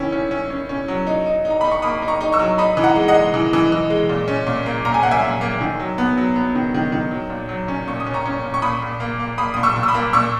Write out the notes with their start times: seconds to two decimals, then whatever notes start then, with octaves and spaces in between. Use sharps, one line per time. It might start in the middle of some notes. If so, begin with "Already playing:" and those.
Already playing: D#3 C#4 E4
0.12 C#4
0.31 C#4
0.50 C#4
0.69 C#4
0.88 F#3
1.07 D#4
1.26 D#4
1.45 D#4
1.50 A#5
1.61 D#4 B5
1.71 C#6
1.82 A#3 B5 D#6
2.02 D#4
2.08 A#5 C#6
2.21 D#4
2.32 C#6 E6
2.39 F#3
2.58 D#4 B5 D#6
2.77 E3
2.84 F#5 A#5
2.96 G#3
3.08 D#5 F#5
3.14 G#3
3.34 E3
3.53 E3
3.72 E3
3.90 G#3
4.09 A#2
4.28 C#4
4.47 A#2
4.66 A#3
4.85 A#2 A#5
4.94 G#5
5.03 A#3 F#5
5.11 E5 G#5
5.23 A#2
5.41 A#3
5.61 D#3
5.80 F#3
5.98 B3
6.17 F#3
6.36 B3
6.55 D#3
6.74 D#3
6.92 D#3
7.11 F#3
7.30 A#2
7.49 F#3
7.68 C#4
7.88 A#2 C#6
8.00 D#6
8.06 C#4
8.14 A#5 C#6
8.25 C#4
8.43 A#2
8.54 C#6
8.62 A#2 B5 D#6
8.82 A#2
9.00 A#3
9.20 A#3
9.38 A#3 B5 D#6
9.54 A#2 D#6
9.63 C#6 E6
9.76 A#2
9.83 E6
9.88 B5 D#6
9.94 A#3
10.13 A#2 C#6 E6